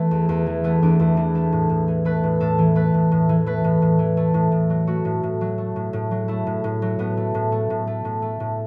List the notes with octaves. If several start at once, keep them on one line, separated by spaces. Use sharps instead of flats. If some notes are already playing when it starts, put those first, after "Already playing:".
Already playing: E3 A3 B3 E4
E2
E2
E3
A3 B3
E2 D4
E2 E4
E3 E4
A3 A4
A2
A2
E3
A3 B4
A2
A2 A4
E3
A3 B4
A2
A2
E3
A3 B4
A2
A2
E3
A3
A2
A2
F#3
A3 F#4
A2
A2
F#3
A3
A2
A2
F#3
A3 E4
A2
A2
F#3
A2 B3
A3
A2
A3
A2
A3
A2
A3
A2